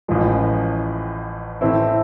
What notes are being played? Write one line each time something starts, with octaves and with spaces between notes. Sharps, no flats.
A1 A2 F3 G#3
A2 E3 A3 C4 E4